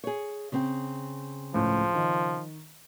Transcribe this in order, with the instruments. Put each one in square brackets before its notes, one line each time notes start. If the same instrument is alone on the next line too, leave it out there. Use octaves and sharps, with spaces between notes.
[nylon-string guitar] G#4 C#5
C#3 C4 G5
[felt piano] C#2 A2 [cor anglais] F3
[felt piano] D#3